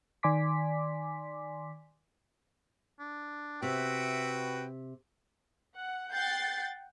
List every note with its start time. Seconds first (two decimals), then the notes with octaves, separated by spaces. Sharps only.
0.23 D#3 D5 G#5 C6 D6 B6
3.00 D4
3.63 C3 F#4 B4 E5 G5
5.77 F#5
6.13 F#5 G5 G6 A6 C7